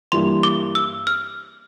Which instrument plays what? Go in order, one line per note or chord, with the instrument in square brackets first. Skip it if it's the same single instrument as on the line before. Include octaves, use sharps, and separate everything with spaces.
[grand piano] G2 E3 G3 A#3 E4 [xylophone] C6
[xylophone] D6
E6
F6